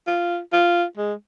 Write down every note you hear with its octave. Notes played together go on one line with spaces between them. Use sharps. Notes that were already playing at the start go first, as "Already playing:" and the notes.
F4
F4
G#3